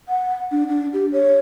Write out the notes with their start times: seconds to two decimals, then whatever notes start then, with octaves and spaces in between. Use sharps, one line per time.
0.09 F#5
0.52 D4
0.68 D4
0.93 G4
1.12 C#5